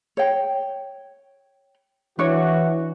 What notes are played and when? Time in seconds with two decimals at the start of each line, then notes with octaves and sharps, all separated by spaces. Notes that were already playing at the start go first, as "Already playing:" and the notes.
0.17 C#5 G5
2.19 E3 D4 F#4 C#5